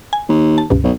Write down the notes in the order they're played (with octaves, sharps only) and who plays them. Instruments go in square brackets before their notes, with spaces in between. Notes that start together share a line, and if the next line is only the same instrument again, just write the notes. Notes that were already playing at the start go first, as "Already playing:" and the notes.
[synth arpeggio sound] G#5
[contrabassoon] D#2
[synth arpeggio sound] A5
C#2 G2 B2
[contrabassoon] B1